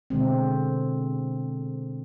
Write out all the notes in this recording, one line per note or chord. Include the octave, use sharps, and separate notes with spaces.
B2 D3 G#3 C4